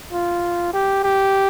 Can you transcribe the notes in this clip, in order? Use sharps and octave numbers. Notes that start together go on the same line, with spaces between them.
F4
G4
G4